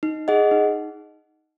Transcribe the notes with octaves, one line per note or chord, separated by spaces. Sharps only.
D#4
G#4 D#5 F#5
D#4